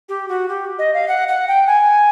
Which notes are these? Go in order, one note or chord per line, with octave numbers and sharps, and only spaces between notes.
G4
F#4
G4
D#5
F5
F#5
F#5
G5
G#5